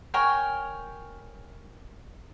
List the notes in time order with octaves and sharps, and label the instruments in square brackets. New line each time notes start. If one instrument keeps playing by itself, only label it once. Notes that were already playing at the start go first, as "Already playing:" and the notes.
[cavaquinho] A#4 C#5 G5 G#5